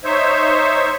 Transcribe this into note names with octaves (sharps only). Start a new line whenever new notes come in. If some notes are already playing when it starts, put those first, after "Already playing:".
D#4 C5 C#5 E5